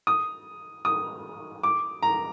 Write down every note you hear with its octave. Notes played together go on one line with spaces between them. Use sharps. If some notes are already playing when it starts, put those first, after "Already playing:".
D#6
D#6
D6
A#5